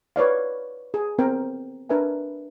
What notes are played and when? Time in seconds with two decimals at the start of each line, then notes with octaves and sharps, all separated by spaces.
0.16 B4 C#5 D5 F5
0.94 G#4
1.18 B3 C4 A#4 G5
1.89 D4 A#4 B4 E5 G#5